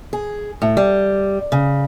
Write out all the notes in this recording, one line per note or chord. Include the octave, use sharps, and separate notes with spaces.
G#4
A2
G3
C#3